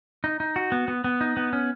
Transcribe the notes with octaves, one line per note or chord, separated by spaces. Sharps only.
D#4
D#4
F#4
B3
B3
B3
D#4
B3
C#4